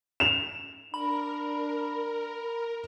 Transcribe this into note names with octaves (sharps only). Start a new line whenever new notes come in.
E7 F7
D4 A#4 B5